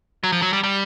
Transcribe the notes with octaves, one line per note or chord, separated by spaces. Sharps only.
F#3
F3
F#3
G3
G3